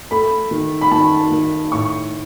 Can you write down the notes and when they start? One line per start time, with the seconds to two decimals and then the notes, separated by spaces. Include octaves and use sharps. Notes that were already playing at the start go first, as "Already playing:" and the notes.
0.11 A3 B5
0.51 D#3
0.81 B5
0.91 D#3 A5
1.32 D#3
1.72 A2 C#6